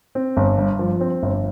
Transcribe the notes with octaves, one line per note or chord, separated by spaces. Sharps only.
C4
G1
G2
F3
C4
G1